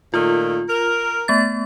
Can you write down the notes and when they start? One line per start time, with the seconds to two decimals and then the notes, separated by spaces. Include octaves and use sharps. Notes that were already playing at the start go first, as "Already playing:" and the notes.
0.14 A#2 D#3 A3 F4
0.69 A#4
1.28 A3 B3 A6